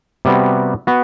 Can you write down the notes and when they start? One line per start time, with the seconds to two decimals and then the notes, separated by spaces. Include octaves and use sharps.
0.25 C3 G3 B3 F#4
0.87 B3 F#4